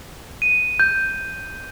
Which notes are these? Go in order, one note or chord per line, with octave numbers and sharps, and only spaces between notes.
D#7
G6